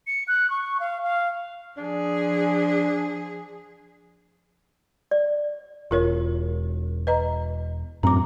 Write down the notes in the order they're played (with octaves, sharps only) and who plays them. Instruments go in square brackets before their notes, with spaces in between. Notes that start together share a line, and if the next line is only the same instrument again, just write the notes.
[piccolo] C#7
F#6
C#6
F5
F5
[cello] F3 G#4 [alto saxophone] D4
[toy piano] D5
[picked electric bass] E1 [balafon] F4 A#4 C#5
[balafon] B4 D#5 A#5
[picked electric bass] F#2 A2 C4 [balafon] A#5 D6